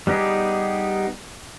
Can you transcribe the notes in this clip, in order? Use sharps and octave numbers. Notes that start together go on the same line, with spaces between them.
G3 B3 D#4 G4 G#4